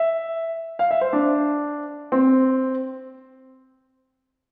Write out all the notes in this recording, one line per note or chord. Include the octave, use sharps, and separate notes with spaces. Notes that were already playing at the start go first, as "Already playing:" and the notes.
Already playing: E5
F5
E5
C5
D4
C4